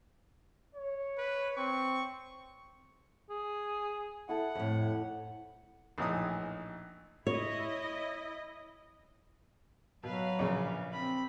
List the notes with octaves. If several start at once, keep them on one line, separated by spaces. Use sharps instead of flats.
C#5
B4
C4 C#6
G#4
E4 A4 F#5
F2 A2
A#1 A2 E3 D#4 G#4 D#6
E4 C#5 D#5
B2 F#3 B4 F5
A#1 C#3
C4 B5